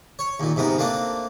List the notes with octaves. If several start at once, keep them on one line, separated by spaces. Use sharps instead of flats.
C#5
D#2 A#2
G#2 C3 B3 A#4
A3 A#3 C4 D4